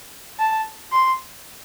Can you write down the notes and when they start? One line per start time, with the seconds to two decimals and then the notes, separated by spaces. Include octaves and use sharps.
0.39 A5
0.91 C6